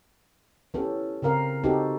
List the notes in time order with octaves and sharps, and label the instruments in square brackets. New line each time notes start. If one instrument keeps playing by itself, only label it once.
[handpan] E3 B3 C#4 G4 A4
C#3 C4 A#4 F5
B3 C4 D#4 F#4 G4 A4